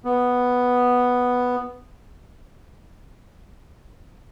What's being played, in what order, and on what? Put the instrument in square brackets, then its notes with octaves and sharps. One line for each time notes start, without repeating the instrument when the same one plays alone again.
[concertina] B3